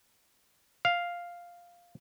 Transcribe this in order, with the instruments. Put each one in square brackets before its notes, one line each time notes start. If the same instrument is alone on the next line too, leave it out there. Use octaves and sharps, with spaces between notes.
[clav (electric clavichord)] F5